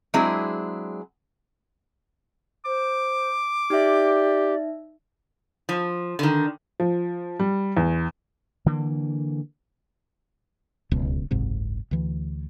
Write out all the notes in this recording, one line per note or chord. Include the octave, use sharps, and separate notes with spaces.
F#3 G#3 C4 D4 E4 G#4
C5 D6
D#4 G4 D5 E5
F3
D3 D#3
F3
G3
E2
D3 E3 A#3
D1 C#2 B2
F#1 C2 G#2 C3
D2 E3